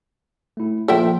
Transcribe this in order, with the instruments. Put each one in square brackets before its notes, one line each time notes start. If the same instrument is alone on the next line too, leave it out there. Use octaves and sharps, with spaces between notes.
[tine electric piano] A3 E4
[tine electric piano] F3 A#3 F4 [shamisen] A4 E5 G5